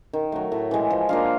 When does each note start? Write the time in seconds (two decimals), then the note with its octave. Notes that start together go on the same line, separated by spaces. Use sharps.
0.13 D#3
0.32 F#3 A3
0.52 A2
0.71 E3 G#3
0.90 F3
1.09 A#3 D4 F4